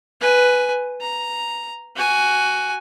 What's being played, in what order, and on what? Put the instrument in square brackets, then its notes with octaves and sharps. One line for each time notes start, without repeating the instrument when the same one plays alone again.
[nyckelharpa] B4 G#5
A#5
F#4 G#5